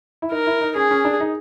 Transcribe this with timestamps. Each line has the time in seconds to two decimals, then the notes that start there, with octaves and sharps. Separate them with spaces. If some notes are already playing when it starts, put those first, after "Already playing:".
0.22 E4
0.32 D#4 A#4
0.47 E4
0.61 D#4
0.76 C#4 G#4
0.91 C#4
1.05 D4
1.20 D#4